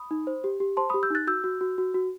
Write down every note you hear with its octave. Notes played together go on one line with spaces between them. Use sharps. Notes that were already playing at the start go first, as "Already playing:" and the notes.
Already playing: B5 D#6
D#4
C5
G4
G4
C5 A5 C6
B5 D#6
G4
E6 G6
D#4 F#6 A6
F#4 E6 G6
F#4
F#4
F#4
F#4